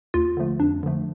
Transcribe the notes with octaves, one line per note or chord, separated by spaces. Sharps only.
D#2 F4
D3 F3 A3
F2 D4
D3 F3 A3